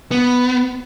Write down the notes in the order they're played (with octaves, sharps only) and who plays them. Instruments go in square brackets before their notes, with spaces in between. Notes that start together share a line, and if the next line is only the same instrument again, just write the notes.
[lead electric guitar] B3